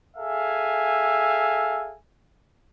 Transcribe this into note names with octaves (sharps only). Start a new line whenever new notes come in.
G#4 A4 E5 F5 G#5